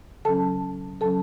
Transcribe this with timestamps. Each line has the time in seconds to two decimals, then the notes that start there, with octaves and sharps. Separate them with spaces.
0.25 C#3 F#3 C#4 A4 A5
1.01 C#3 F#3 C#4 A4 A5